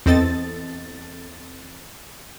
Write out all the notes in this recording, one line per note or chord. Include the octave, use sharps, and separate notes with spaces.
E2 C4 A4 D#5 A6